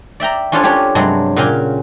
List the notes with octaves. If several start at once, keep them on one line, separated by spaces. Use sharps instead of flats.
D5 E5 G5 A#5
C#4 D4 F4 A4 C5 C#5
D4 F4 G4 C#5
G2 C3 F#3 G#3
A#2 C#3 F#4 F5 G5 G#5